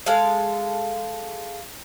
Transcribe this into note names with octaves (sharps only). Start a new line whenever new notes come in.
G#3 A4 F5